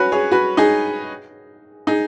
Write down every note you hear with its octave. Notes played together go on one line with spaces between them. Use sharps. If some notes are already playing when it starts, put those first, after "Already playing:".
Already playing: C#4 F#4 B4
G#4 C#5
F#4 B4
D#4 G#4
D#4 G#4